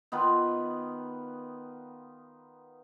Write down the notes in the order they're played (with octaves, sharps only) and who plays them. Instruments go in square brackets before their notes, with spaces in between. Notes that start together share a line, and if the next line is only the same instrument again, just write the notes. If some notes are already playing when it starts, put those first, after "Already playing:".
[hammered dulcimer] D#3 B3 F4 B4